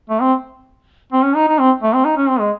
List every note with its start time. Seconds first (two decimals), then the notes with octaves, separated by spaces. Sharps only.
0.10 A3
0.21 C4
1.13 C4
1.24 C#4
1.36 D#4
1.48 D#4
1.59 C4
1.83 A3
1.94 C4
2.05 D#4
2.17 C#4
2.29 C4
2.39 G#3